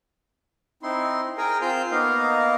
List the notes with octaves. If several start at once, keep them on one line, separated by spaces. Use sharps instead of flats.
C4 D#4 E4 C6
G#4 A#4 G5 G#5 A#5
C4 F4 C5 F6 G6
A#3 B3 D#4 A#4 D#5 F5